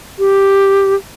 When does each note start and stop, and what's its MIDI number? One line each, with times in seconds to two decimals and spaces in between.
0.19 0.95 67